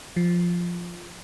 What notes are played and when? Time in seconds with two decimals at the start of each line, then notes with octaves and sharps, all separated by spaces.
0.16 F3